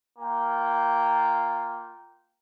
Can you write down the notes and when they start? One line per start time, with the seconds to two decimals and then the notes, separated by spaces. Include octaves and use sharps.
0.18 A#3 F4 G5